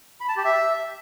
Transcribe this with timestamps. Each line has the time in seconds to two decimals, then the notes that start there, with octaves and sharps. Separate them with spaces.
0.20 B5
0.28 A5
0.37 G4
0.45 E5